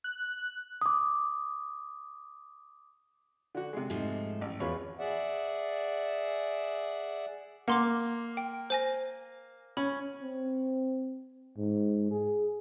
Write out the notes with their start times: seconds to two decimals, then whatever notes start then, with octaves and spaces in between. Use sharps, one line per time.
0.04 F#6
0.82 D6 D#6
3.55 D3 F#4
3.73 C3 G#3
3.90 G#2 F3 A3
4.41 A1
4.60 E2 B2 F4 B4 C#5
4.99 G#4 D5 E5 F#5
7.68 A#3 F#5 C6 D6
8.37 G5
8.70 C5 G#5 A#6
9.77 C#4 B5
10.22 C4
11.58 G#2
12.11 G#4